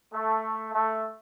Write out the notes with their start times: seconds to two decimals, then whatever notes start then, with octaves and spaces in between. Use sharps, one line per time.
0.12 A3
0.73 A3